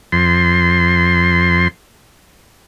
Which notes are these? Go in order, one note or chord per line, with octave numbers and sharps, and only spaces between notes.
F2 C6